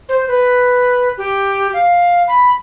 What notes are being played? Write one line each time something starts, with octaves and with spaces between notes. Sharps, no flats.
C5
B4
G4
F5
B5